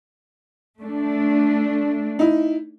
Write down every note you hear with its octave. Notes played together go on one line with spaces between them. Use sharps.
A3 D4
D#4 E4